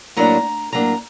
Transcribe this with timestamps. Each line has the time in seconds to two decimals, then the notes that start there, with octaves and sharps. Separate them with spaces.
0.16 A2 F#3 A#3 D4 A#5
0.72 A2 F#3 A#3 D4 A#5